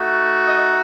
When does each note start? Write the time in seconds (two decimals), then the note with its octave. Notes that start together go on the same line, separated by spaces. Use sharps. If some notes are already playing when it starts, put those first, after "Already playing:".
Already playing: A3 D#4 F#4
0.46 D#5